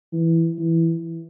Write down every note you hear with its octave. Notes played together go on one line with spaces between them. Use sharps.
E3
E3